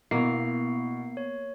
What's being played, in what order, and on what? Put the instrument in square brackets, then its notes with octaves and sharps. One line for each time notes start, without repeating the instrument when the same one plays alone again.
[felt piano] B2 [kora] A#3 [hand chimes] B3 C7 [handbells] E4 A#5
[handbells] C#5